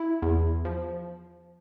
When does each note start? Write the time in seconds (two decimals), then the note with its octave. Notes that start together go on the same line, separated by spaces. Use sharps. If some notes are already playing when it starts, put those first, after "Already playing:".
Already playing: E4
0.22 E2
0.65 F3